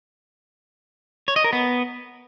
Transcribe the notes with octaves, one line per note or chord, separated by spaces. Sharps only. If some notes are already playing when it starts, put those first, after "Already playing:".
C#5
D#5
A#4
B3